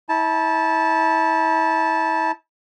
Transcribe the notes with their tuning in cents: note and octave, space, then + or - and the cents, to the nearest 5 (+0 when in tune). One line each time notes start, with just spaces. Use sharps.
E4 -35 A5 -10